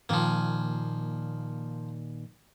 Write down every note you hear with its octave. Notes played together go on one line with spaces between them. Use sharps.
A#2 D#3 F3 A#3 G#5